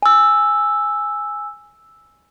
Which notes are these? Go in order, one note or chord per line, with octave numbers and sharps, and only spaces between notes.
G#5 E6